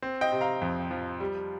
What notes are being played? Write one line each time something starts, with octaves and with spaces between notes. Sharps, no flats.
C4
D#5 G5
C3
F5 A#5
F2
F3
G3